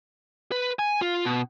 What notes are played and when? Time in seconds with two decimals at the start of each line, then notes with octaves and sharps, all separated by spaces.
0.52 B4
0.79 G#5
1.02 F4
1.25 B2